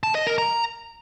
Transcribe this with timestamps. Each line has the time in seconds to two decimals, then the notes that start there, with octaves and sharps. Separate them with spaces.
0.03 A5
0.15 D#5
0.27 A#4
0.38 A#5